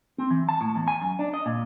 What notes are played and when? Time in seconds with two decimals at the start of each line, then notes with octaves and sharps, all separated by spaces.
0.18 C4
0.31 E3
0.49 A5
0.61 A2
0.76 E2
0.88 G#5
1.02 F#2
1.19 D4
1.34 D#5
1.46 A#2